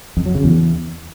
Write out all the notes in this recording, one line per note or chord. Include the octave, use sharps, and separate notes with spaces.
F2
F#3
C#3
E2